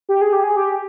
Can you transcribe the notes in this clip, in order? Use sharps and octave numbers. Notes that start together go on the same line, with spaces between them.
G4
G#4
G4
G#4
G4